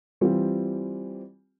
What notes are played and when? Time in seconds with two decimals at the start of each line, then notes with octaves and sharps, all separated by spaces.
0.21 E3 G3 C4 F4 G4